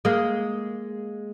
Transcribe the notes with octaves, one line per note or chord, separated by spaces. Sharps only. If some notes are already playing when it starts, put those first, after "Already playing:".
G#3 A#3